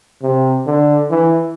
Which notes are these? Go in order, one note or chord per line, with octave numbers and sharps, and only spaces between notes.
C3
D3
E3